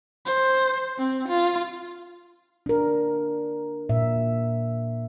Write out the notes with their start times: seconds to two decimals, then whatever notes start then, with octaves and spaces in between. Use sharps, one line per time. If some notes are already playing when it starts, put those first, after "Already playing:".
0.26 C5
0.99 C4
1.28 F4
2.66 D4 A#4
3.89 A#2 E5